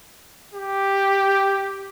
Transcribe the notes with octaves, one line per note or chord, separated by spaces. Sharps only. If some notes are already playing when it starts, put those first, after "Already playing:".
G4